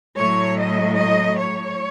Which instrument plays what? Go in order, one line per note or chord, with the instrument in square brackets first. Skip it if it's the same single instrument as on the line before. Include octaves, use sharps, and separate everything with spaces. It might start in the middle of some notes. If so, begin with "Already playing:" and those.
[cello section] A2 F#3 C#5
D#5
D#5
C#5